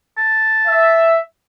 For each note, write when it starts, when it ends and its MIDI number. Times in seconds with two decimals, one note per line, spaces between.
0.18 1.17 81
0.66 1.19 76